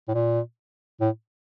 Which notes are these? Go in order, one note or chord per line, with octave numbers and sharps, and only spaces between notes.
A2
A#2
A2